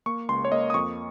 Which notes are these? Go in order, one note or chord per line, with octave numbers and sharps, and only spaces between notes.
A#3 C#6
C#2 C6
C#5
A#3 D#5
D#6
F2 C#6